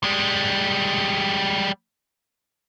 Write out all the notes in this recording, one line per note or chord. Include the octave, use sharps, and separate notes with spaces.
G3 G#3